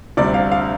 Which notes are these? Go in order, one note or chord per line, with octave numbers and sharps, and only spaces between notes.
D2 C3 G3 D5
F5
F5